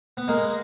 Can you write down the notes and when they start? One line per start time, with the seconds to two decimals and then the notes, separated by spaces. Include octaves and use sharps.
0.17 B3
0.28 G#3 A#3